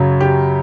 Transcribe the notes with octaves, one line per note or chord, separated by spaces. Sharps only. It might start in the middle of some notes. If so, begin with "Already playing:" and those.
Already playing: F#2 C#3 F#3
G4